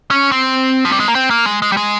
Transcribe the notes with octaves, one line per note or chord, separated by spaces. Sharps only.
C#4
C4
F3
G3
G#3
A#3
C4
A#3
G#3
G#3
G3
G#3